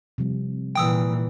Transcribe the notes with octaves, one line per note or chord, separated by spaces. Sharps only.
C3 F3 G3
A#2 E3 G5 D#6 E6